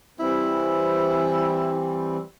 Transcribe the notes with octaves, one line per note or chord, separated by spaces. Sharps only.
E3 G3 C4 E4